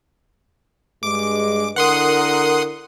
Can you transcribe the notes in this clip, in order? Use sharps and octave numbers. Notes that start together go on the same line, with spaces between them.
G2 G#3 D6
D3 E4 A#4 F#5 C6 D#6